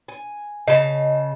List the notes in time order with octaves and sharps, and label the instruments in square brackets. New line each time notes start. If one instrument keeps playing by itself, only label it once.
[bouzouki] G#5
[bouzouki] C#3 A5 [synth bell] D#5